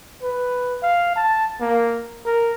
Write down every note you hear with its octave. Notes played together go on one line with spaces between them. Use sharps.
B4
F5
A5
A#3
A#4